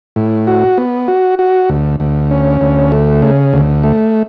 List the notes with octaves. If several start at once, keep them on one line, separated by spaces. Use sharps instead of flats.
A2
F#4
B3
F#4
F#4
D2
D2
C#4
D2
A3
C#3
D2
A3